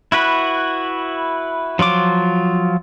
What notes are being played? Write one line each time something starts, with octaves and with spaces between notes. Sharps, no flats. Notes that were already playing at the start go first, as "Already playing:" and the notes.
E4 F#4 B4
F3 F#3 F4 D6